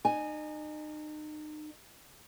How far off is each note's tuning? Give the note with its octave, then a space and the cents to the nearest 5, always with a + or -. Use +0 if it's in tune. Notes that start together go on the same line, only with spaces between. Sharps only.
D#4 -35 G#5 +0